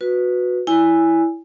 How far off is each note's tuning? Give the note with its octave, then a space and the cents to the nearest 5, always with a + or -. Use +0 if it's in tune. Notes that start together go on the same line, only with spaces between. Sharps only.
F#4 -20 B4 +0
E4 +0 D5 -45 G#5 -10